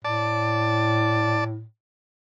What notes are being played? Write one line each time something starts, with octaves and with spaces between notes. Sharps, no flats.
A2 D5 A5